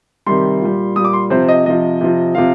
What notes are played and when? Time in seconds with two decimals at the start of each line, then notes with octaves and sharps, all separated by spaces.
0.26 C3 D#3 G3 C6
0.61 A#2 G3
0.96 A#2 G3 D#6
1.05 D6
1.13 C6
1.30 C3 F3 C5
1.48 D#5
1.66 C3 F3 D#5
2.01 C3 F3
2.35 C3 F3 F5